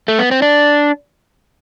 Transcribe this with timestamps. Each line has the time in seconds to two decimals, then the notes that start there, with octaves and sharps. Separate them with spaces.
0.08 A3
0.19 B3
0.31 C4
0.42 D4